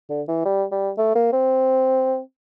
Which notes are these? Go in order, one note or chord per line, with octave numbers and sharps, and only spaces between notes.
D3
E3
G3
G3
A3
A#3
C4